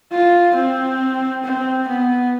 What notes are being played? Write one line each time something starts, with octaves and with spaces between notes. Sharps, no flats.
F4
C4
C4
B3